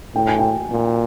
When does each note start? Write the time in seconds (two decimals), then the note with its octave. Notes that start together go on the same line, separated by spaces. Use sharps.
0.15 A2 G5
0.27 G#5
0.39 G5
0.71 A#2